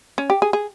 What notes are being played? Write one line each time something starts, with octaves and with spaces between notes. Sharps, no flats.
C#4
G4
G#4
G#4